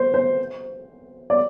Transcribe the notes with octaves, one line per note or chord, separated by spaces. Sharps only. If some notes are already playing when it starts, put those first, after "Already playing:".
Already playing: C5
C5
D5